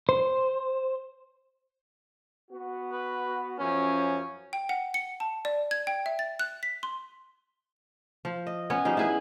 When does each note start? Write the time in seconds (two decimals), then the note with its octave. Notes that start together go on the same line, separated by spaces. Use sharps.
0.09 C5
2.51 B3 F#4
2.92 B4
3.60 F#2 F3 C#4
4.53 G5
4.69 F#5
4.94 C#7
5.20 A5
5.45 D5
5.71 G#6
5.87 G5
6.06 E5
6.19 A6
6.39 F#6
6.63 B6
6.83 C6
8.25 F3
8.47 D#5
8.70 B3 C#4 C#5
8.85 F3 G3 D#4 G#4
8.97 E4 G#4 B4